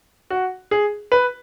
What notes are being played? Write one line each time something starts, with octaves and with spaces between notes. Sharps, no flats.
F#4
G#4
B4